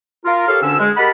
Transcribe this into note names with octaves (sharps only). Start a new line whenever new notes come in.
F4 A#4
G4 A4 A#4 C#5 F5
D2 D3 C#4 D4 E6
G#3
G4 A#4 D#5 F#5 A5 B5